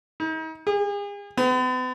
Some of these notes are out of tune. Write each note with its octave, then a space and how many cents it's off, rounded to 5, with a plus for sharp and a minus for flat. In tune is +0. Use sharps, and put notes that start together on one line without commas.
D#4 +40
G#4 -40
B3 +45